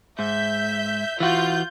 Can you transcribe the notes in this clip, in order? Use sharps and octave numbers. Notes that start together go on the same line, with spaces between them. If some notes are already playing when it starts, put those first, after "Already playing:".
G#2 E5 G6 B6
E3 F4 F#4 G6